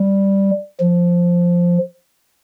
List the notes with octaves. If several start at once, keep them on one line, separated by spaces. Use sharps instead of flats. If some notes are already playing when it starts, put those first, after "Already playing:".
Already playing: G3
F3